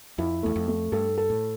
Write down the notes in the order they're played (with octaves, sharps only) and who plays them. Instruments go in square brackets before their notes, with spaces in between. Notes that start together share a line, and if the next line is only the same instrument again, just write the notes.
[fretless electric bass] F2 [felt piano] E4
[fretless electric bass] E2 [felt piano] A3
[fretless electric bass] F2
[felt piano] A3
[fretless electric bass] G2 [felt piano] A4
[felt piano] A4
[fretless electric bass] A2